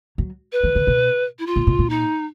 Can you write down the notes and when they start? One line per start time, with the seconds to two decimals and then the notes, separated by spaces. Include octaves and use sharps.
0.18 F#3
0.52 B4
0.64 E3
0.75 D3
0.87 B2
1.39 E4
1.47 F4
1.56 A#2
1.67 B2
1.79 A#2
1.90 D#4